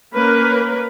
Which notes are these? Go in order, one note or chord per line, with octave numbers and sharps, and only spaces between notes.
A#3 C#4 A#4 B4